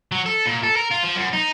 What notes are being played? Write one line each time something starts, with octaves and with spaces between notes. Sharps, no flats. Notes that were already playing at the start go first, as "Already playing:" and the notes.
F#3
A4
A#2
A4
A#4
F4
F3
F#2
D#4